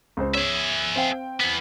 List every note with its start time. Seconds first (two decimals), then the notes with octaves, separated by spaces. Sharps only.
0.17 C#2 C5
0.35 G#4 C#5 E5
0.96 C4 F5 G5
1.41 E3 B3